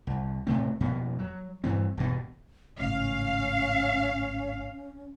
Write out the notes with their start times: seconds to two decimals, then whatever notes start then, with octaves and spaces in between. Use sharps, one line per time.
0.07 C2
0.47 A2 C3 A3 C4
0.80 F2 B2 A#3 B3
1.19 F#3
1.64 G2 E3 C4
1.97 E1 G2 B2
2.80 G#1 A2 C#3 C#4 F5